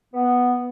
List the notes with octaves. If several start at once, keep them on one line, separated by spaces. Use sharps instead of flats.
B3